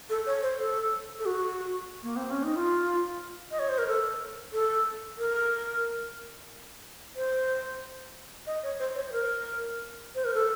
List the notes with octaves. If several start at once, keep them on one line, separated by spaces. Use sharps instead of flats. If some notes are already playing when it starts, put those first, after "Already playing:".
A4
C#5
C5
A4
A4
F#4
A#3
C4
C#4
D#4
F4
D#5
C#5
C5
A#4
A4
A4
A#4
C5
D#5
C#5
C5
C#5
C5
A#4
C5
A#4
A4